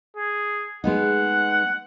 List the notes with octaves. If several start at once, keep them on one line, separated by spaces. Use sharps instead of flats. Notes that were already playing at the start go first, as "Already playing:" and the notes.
G#4
G#3 B3 D#4 F#5